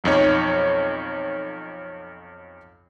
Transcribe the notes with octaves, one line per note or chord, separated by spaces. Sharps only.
B1 F2 D#4 C#5